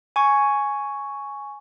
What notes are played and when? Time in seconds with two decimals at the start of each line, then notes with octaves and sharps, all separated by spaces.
0.16 G#5 C#6